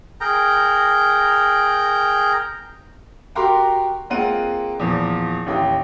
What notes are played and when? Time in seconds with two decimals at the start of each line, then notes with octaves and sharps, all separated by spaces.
0.21 G#4 A#4 G5 A#5
3.35 F#4 G4 A#4 A#5 C6 D6
4.10 G#3 A#3 C4 F4 F#5 D#7
4.79 E2 A#2 F3
5.46 A1 D#2 D#4 G4 D#5